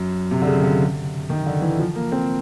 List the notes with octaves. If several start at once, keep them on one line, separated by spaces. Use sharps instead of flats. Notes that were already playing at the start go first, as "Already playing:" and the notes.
Already playing: F#2
C3
D3
C#3
D3
D#3
D3
E3
F3
A#3
C4